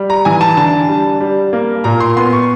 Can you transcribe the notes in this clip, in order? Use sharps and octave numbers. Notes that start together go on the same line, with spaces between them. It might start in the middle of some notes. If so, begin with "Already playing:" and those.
Already playing: G3
A#5
E3 G#5
A5
D3 A5
G3
G3
A#3
A#2 A#5
C6
B3 C6
C#6